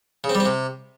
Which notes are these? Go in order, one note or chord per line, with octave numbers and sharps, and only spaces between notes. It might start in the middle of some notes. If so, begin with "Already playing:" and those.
C#3
C4
G3
C4
C3